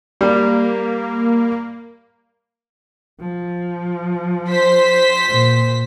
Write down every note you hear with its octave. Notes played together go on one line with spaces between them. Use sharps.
G3 A#3
F3
C5 B6
A#2